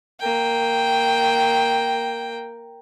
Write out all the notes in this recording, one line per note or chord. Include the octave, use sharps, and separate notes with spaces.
A#3 G5